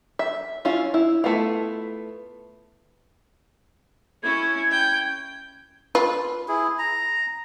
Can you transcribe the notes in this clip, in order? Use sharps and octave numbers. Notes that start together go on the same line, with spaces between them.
E5
C#4 E4 F4
E4
A3 B3 E4 F4
C#4 E4 G#6
G5
F4 B4
E4 G#4
A#5